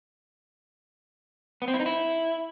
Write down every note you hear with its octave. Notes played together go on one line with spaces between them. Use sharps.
B3
C4
E4
D#4
E4